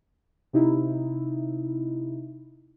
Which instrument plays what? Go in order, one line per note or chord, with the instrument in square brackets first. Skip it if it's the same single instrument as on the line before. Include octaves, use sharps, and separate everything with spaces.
[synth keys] C3 D#4 E4